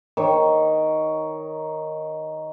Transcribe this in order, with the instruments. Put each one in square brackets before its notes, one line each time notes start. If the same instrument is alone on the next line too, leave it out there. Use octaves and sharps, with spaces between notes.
[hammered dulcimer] D#3 C#5